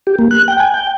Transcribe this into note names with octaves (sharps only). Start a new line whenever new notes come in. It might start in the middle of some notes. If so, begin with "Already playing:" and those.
G4
A#3
F#6
G5
G#5
G5